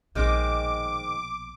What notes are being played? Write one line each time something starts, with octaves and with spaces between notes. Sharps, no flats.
A#1 B2 D#3 G#3 C4 D6